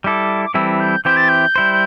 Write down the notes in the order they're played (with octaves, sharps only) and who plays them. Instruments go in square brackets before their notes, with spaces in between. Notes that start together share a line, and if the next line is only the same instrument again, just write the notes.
[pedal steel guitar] G3 E4 A4 [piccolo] D6
[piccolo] D6
[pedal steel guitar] E3 G3 C4 E4 A4 [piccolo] E6
[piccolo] G6
[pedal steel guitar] E3 C4 E4 G4 C5 [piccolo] G6
[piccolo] A6
G6
[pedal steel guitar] G3 E4 C5